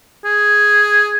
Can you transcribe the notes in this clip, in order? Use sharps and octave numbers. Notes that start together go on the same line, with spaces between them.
G#4